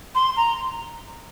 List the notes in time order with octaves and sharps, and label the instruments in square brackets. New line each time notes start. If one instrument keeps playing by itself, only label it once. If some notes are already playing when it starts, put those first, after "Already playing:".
[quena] C6
A#5